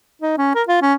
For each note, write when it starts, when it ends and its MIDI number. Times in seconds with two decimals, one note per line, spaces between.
0.22 0.34 63
0.38 0.52 61
0.55 0.63 70
0.68 0.77 65
0.82 0.94 61